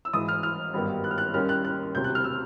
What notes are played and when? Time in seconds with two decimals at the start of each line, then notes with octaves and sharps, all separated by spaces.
0.05 E6
0.13 G#1 G#2 E3 D#6
0.29 F6
0.43 F6
0.73 G#1 G2 D#3 G3 B3
1.04 F#6
1.11 F6
1.18 F#6
1.34 D#2 D#3 G3 A#3 C#4 F6
1.49 F#6
1.64 F#6
1.95 E1 D2 C3 G6
2.04 F#6
2.15 F6
2.24 E6